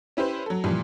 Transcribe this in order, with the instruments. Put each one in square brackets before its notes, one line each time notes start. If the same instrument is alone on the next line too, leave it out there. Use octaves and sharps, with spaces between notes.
[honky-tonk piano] C#4 E4 G4 B4 C5
F#3 A4
A#2 E3 F3 G3